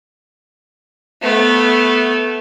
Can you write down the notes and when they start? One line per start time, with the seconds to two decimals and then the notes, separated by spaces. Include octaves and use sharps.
1.22 A3 B3